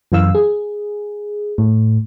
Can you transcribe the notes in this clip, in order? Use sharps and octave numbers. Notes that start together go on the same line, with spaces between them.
F#2 E3 F5 E6
G#4
A2